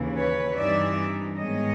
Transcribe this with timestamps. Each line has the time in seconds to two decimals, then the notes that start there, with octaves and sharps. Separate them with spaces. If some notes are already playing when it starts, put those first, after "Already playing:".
Already playing: D#2 C#3 E3
0.14 B4 C#5
0.55 G2 E3 G3 C4 D#4 D5 E5
1.38 G#2 D#3 G#3 B3 C#5 D#5